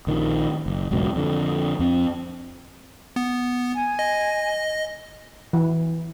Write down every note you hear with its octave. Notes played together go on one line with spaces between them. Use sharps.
A#1 D#3 F3
F#1
E1 C#2 F#2 B2
F2 D3
F2 C4
B3
G#5
D#5
E3